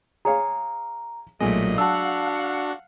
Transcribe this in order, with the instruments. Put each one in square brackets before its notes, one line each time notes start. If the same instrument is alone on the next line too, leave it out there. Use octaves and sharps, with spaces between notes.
[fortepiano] G#4 C#5 F5 [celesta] A#5
[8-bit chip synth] B1 A#2 D#5 [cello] F#3 A3 [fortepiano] G#3
[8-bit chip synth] D4 F#4 [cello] F5 F#5 [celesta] A5 E6